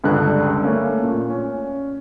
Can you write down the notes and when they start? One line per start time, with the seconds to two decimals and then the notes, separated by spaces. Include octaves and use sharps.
0.04 C#2 G2 D3 F#6
0.62 A3 A#3 C#4
1.03 A#2
1.30 C#4